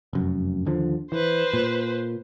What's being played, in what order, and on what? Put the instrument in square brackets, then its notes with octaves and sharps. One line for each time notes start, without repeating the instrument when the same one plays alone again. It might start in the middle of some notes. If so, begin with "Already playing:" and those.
[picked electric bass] F1 F#2
D#2 D3 F3
[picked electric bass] E3 [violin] B4 C5
[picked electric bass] A#2